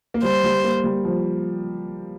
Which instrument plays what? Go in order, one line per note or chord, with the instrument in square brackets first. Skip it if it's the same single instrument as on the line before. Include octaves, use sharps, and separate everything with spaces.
[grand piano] A#3
[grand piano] G3 [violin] C5
[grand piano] G3
A#3
G3
F3